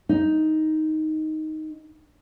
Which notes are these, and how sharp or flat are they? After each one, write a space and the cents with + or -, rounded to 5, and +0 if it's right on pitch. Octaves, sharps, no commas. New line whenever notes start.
D#4 +5